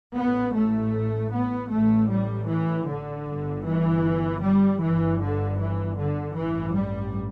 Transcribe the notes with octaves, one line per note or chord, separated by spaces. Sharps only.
A1 A2 B3
A3
B3
A1 A2 A3
G3
E3
D3
G1 G2
E3
G3
G1 G2 E3
D3
E3
D3
A1 G2 E3
G3